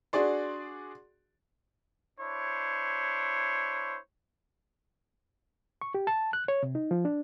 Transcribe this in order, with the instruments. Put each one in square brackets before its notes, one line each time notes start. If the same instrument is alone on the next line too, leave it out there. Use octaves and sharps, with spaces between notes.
[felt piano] D4 F#4 G#4 D5 C6
[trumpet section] D4 E4 C5 C#5
[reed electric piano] C#6
G4
A5
F#6
C#5
C3
D#4
F3
D4